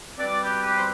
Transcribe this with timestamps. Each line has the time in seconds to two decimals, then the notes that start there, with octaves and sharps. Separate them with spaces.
0.18 B2 G3 C4 B4 D5
0.41 G4 B4
0.62 G4 B4
0.76 C5